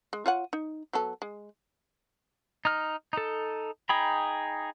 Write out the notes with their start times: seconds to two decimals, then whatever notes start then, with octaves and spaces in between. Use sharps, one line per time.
0.13 G#3
0.26 F4 C#5 F#5
0.53 D#4
0.93 F#3 B3 A4
1.22 G#3
2.65 D#4 F6
3.13 D#4 A4
3.89 D#4 G#4 G5 A#5 B5